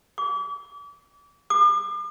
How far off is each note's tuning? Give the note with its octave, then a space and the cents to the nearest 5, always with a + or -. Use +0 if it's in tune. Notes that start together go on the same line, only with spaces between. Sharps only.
D6 -40
D6 +45